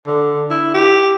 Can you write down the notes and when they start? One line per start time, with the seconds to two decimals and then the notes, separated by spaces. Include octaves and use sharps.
0.07 D3
0.50 E4
0.74 G4